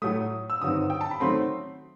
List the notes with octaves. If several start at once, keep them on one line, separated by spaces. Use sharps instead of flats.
A2 F#3 A3 D#6
E6
G1 G2 D#3 F#3 C4 D#6
G5
A5
B5
D#3 F#3 A3 C4 C6